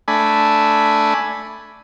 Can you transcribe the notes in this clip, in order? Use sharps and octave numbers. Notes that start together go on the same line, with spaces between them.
A3 D4 G#5 B5